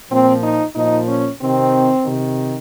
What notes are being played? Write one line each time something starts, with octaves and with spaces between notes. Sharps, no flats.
A#2 F3 C4
D#4
A#2 F3 D#4
C#4
C3 D#3 C4
C3 D#3